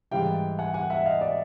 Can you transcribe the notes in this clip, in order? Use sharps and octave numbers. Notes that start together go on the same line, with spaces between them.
G#2 E3 G3 F5 G5
F#5 G#5
F#5 G#5
E5 F#5
D#5 F5
D5 E5